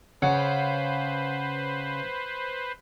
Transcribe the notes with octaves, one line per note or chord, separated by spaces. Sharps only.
C#3 B4 C5 F#5